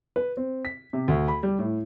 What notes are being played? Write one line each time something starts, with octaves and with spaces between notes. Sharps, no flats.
B4
C4
B6
C3
D2
B5
G3
A2